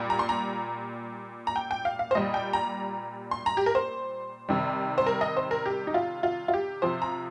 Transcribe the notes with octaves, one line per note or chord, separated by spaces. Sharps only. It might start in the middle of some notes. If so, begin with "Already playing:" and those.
Already playing: A#2 G3
A#5
C6
A#5
A#5
G5
G5
F5
F5
C5
A#2 G3 D#5
G5
A#5
C6
A#5
G4
A#4
C5
C3 D#3 G3
C5
A#4
D#5
C5
A#4
G4
D#4
F4
F4
F4
G4
C3 F3 C5
A#5